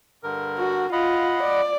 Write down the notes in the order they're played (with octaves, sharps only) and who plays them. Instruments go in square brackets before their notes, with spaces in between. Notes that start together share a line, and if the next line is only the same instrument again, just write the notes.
[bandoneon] G2 D3 A#4
[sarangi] F#4
[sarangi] F4 [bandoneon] D#5 F#5 B5
[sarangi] D5